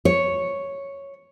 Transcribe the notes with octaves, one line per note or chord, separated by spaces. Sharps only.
C#5